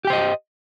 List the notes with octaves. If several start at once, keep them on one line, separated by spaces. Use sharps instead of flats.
G4 C5 D#5 G5